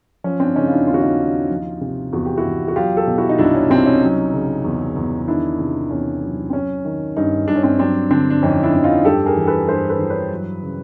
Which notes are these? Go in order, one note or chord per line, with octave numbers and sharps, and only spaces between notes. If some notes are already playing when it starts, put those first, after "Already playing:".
F3 C#4
C4 D4
C#3 C#4 D#4
F4
D4 E4
D#2 F4
F#4
D#4 F4
D#2
F3
C3
E2 F#4
G4
E4 F#4
E2
F#4
F#3 F4 G4
G4 A4
B2
E4 F#4
D#4
C2 D4 E4
C#4
C2 C4 D4
C#4 D#4
F#3
C#3
E2
E2
D#3 D4 E4
C3
E2 C#4
F#3
C4
F#3 C#4
D#3
G2 C#4 D#4
G2 D4
C#4
C4 D4
F#3 C4 D4
D3 C4 D4
D4
F2 C#4 D#4
D4 E4
F2
D#4 F4
G2 G4 A4
G#4 A#4
E3
A4 B4
G2 A#4 C5
A4 B4
E3
B4 C#5
F#3
C#3